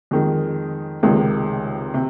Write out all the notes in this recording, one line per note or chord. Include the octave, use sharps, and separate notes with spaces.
F2 D#3 G#3
C#2 C3 D#3 G#3
C3